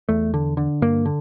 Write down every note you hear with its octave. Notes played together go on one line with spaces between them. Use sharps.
E2 A3
D3
D3
G2 A#3
D3